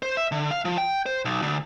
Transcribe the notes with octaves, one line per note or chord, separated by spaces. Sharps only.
C5
E5
D3
F5
F3
G5
C5
B1
D2